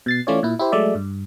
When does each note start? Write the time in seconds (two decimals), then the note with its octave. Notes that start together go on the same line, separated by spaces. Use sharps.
0.06 B2 A6 C7
0.27 E3 A3 C#4 F4 C#5 D5
0.43 A#2 E4
0.59 E4 G4 C5
0.72 F#3 G#3 A3 D5 E5
0.95 G2